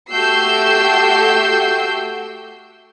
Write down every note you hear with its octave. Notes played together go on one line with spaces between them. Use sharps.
A3 F#4 G4 E6 G6 C7